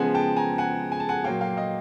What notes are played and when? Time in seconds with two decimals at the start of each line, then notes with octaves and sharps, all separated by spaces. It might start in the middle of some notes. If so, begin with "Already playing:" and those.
Already playing: C#3 F3 G#3 B3 F#5 G#5
0.15 G5 A5
0.36 G#5 A#5
0.58 F#5 G#5
0.92 G#5
1.00 A5
1.09 F#5 G#5
1.24 A#2 F#3 A#3 F5 G5
1.41 F5 G5
1.57 D#5 F5